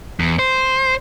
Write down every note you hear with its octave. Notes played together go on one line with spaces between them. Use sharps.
E2
C5